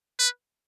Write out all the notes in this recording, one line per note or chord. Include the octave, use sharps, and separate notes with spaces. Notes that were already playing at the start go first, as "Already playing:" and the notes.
B4